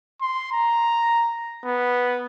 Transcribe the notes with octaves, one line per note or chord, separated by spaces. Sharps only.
C6
A#5
B3